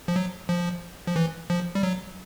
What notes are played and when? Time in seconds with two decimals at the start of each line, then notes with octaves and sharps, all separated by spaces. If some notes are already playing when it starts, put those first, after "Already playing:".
0.08 F3
0.16 F#3
0.49 F3
1.07 F3
1.16 E3
1.50 F3
1.75 G3
1.83 F#3